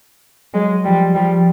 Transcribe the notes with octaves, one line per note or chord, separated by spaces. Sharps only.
F#3 G#3
F3 G3
F3 G3